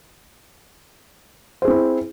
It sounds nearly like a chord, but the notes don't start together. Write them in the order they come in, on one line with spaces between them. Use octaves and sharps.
C5 G#4 C4 E4